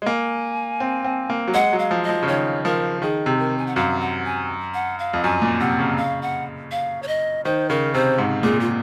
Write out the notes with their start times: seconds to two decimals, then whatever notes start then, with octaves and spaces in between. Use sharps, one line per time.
0.02 G#3
0.06 A#3 G#5
0.80 C4
1.04 C4
1.30 A#3
1.48 F#3
1.54 G#3 F#5
1.73 F#3
1.79 F5
1.91 F3
2.03 D#5
2.09 F3
2.23 C#3
2.28 D#3 C#5
2.65 F3 A#4
3.02 D#3 G#4
3.26 C3
3.39 A#4
3.58 G#5
3.66 F#5
3.76 F#2 F5
4.01 F#5
4.25 G#5
4.74 F#5
4.99 F5
5.13 F2
5.23 F#2 G#5
5.42 A#2
5.60 C3 F#5
5.79 C#3
5.97 F5
6.22 F#5
6.71 F5
7.02 C#5
7.08 D#5
7.45 D#3 C5
7.69 C#3 A#4
7.94 C3 C5
8.18 G#2
8.43 A#2 G#4
8.60 F4